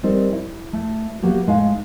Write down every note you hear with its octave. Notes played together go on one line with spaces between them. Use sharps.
G3 C4 D#4 A#4
E4
A3
F#3 A#3 B3 G4
A2 G#3 D#4 F5